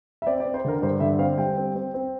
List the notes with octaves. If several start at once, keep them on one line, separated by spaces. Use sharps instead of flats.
E5
C4 D5
D5
C4
C5
D3 A#4
G2 C5
D3 E5
C4 F5
G3 G5
C4
C4
C4